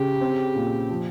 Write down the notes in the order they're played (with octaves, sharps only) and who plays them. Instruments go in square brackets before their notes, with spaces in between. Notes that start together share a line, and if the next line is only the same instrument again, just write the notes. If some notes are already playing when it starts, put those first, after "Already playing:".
Already playing: [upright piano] C#3 [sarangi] G4
[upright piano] C4
A#2
F3